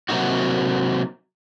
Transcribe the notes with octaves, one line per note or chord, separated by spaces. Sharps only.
C3 F#3 A#3 D#4 F#4